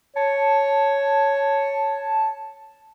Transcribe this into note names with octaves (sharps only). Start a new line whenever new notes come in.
C#5 A5